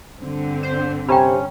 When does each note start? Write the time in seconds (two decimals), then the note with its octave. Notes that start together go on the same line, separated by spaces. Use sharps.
0.20 G2 D3 C4
0.63 C5
1.08 C3 C#4 G5 A#5 B5